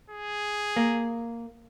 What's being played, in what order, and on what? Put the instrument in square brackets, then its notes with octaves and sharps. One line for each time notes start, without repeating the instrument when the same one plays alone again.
[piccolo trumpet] G#4
[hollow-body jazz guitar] A#3